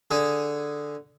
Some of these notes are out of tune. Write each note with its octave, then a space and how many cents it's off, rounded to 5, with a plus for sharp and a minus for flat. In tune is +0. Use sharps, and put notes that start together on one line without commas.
D3 +0 G#4 +0